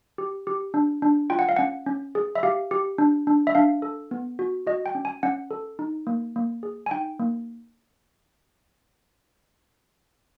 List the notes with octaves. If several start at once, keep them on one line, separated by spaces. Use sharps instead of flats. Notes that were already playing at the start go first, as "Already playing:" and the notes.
G4
G4
D4
D4
F4 G5
F#5
F5
C#4 F#5
C#4
G#4
E5
G4 F5
G4
D4
D4
E5
D4 F5
A4
B3
F#4
F#4 D#5
G5
C#4
G#5
C#4 F#5
A4
D#4
A#3
A#3
G#4
G#5
D#4 G5
A#3